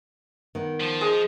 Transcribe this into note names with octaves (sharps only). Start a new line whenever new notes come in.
D#3 B3
F3
G#3 D#5